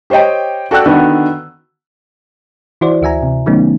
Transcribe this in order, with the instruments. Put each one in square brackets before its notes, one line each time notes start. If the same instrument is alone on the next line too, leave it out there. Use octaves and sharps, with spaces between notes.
[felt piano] G4 C5 C#5 D#5 G5
F#4 A4 D5 G5 E6 F#6
D3 D#3 B3 D4 F#4
[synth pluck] E3 E4 F#4 C5 D5
D2 F#4 E5 G#5 A#5
C3
D#3 F#3 A3 B3 C#4 D#4